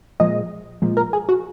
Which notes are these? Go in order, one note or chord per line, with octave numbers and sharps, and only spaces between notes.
A#2 F3 G#3 D#5
A#2 F3 G#3
A#4
G#4
F#4